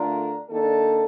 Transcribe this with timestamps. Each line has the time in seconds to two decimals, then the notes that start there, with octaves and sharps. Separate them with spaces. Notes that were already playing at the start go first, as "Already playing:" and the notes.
Already playing: D3 A3 D4 F4 A#4
0.49 D#3 A#3 D4 A4